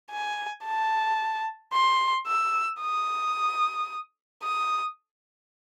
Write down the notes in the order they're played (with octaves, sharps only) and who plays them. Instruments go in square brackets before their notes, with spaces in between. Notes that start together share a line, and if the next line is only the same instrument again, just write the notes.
[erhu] G#5
A5
C6
E6
D#6
D#6